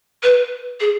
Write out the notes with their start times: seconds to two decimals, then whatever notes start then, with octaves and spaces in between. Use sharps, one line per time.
0.23 B4
0.80 G#4